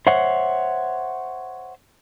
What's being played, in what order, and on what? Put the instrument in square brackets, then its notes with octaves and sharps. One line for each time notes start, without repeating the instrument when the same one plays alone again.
[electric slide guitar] C5 C#5 E5 F#5